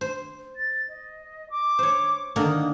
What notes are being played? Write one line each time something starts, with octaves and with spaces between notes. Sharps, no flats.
C5
A6
D#5
D6
C5 C#5
D3 D#3 A#3 D#6